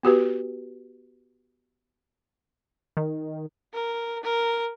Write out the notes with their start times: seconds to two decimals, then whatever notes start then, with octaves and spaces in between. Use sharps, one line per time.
0.03 B3 F#4 G4 B4
2.97 D#3
3.74 A#4
4.24 A#4